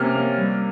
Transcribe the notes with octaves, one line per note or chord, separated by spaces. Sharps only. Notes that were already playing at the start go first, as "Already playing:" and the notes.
Already playing: C3 A#3 C#4 F6
A#3
G3